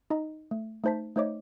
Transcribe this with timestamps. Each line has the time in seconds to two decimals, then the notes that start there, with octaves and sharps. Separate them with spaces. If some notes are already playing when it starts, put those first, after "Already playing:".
0.10 D#4 D#5 A#5
0.51 A3
0.84 A3 D#4 C5 A5 B6
1.16 A3 D#4 C5 C#5 D#5 D6